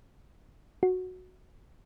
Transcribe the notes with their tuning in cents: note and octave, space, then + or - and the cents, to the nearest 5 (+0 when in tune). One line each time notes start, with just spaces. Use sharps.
F#4 -10